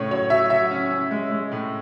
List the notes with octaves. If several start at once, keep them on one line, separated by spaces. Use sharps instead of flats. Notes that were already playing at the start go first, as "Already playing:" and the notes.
Already playing: A2 C#3 C#5
F#3 C#5
F#3 E5
F#3 E5
C#4
C#4
G#3
G#3
A2